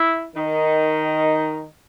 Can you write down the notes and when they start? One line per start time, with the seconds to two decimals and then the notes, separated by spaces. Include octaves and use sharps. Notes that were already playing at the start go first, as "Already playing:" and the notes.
Already playing: E4
0.35 D#3 D#4